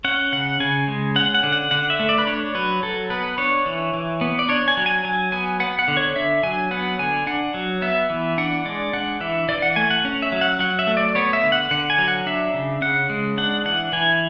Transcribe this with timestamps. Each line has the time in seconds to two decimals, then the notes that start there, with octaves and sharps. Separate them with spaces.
0.04 C#4 F#5
0.33 C#3 F#5
0.60 C#3 G#5
0.88 G#3
1.16 C#4 F#5
1.35 F#5
1.43 D3
1.52 F#5
1.71 D3 F#5
1.90 E5
1.99 A3
2.09 D5
2.18 B4
2.27 D4 C#5
2.55 F#3 B4
2.83 F#3 A4
3.10 B3 B4
3.38 D4 C#5
3.66 E3
3.94 E3
4.21 B3
4.39 D5
4.49 D4 C#5
4.68 G#5
4.77 F#3
4.86 G#5
5.05 F#3 G#5
5.32 B3 G#5
5.60 B3 F#5
5.79 F#5
5.88 D3
5.97 C#5
6.16 D4 E5
6.43 F#3 G#5
6.71 B3 F#5
6.99 D3 G#5
7.26 D4 F#5
7.54 F#3
7.82 B3 E5
8.10 E3
8.38 D4 F#5
8.65 G#3 D5
8.93 D4 F#5
9.21 E3 E5
9.49 E3 D5
9.62 F#5
9.76 A3 G#5
9.90 F#5
10.05 C#4
10.22 E5
10.32 F#3
10.41 F#5
10.59 F#3 F#5
10.79 E5
10.87 A3
10.97 D5
11.15 B3 C#5
11.33 E5
11.43 D3
11.52 F#5
11.71 D3 F#5
11.90 G#5
11.98 F#3
12.08 F#5
12.26 D4 E5
12.54 C#3
12.82 C#3 F#5
13.10 G#3
13.38 D4 F#5
13.65 E3 F#5
13.93 E3 G#5